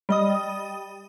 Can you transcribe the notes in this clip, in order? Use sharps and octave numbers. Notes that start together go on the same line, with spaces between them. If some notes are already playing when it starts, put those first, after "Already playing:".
G3 D#5 D#6